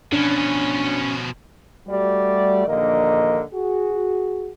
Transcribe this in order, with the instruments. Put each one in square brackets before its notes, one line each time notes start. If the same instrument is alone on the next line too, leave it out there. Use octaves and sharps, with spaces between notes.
[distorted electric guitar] B2 F3 [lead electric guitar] C#4 C#5 [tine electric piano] D4
[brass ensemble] G3 A3 F#4 D5
A#1 D#2 D3 A#3 A#4 D#5
F#4 G#4